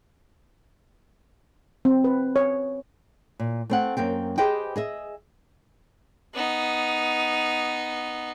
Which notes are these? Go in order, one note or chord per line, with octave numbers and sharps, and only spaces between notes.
C4
B4
C#5
A#2
A3 C4 F#5
F#2 A#3 C4 G5
G4 G#4 B4 C5 D#5 G5
G#4 D#5 E5
B3 D#4